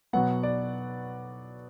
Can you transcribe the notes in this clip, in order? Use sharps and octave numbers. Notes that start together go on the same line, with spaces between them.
B2 F#3 B3 F#5
D5